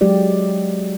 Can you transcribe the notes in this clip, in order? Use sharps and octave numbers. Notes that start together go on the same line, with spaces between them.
F#3 G#3 G4 D5